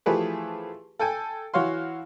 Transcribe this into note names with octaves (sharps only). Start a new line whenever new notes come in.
E3 F3 A3 G4 G#4 B4
A4 G5 G#5
E3 F#4 C#5 F5 C6